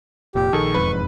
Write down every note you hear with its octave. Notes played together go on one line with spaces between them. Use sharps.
F1 A#2 G4
A#1 D#3 G#4 A4 C#6
E1 F2 G#2 B4